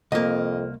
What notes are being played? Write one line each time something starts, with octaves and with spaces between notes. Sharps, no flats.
C2 F2 A#3 D#5